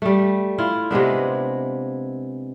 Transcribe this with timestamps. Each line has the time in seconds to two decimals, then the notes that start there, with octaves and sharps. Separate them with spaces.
0.02 G3 A3
0.58 E4 F4
0.91 C3 G#3 B3 D4